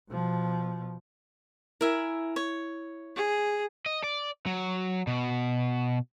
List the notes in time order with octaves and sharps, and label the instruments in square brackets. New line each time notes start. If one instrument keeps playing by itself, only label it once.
[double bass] B2 F3
[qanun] E4 [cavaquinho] A#4 E5 G#5
[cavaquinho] C#5
[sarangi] G#4
[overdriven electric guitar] D#5
D5
F#3
B2